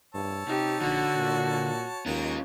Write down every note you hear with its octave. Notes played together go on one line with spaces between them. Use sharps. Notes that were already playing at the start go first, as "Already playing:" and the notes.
G2 C#5 A5 E6
C3 D#4 G4
A#1 D3 F#4
A#2
D#2 C#4 F4 A#4 A#5